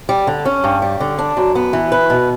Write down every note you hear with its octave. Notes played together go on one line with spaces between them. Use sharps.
G3
D3
C#4
G2
G3
D3
D4
F#2
B3
E3
B4
B2